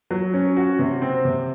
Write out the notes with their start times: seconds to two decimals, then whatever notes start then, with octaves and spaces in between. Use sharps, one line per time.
0.11 F#3
0.34 C#4
0.57 F#4
0.79 C3
1.02 C4
1.25 C3